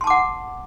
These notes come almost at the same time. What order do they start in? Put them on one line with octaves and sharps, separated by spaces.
C6 A5 D6 F#5